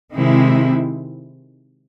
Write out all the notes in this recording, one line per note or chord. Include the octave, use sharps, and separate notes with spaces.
C3 D#3 G#3 C4 E4